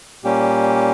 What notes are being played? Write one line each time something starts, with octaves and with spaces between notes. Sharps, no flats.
A#2 G3 A#3 C#4 G4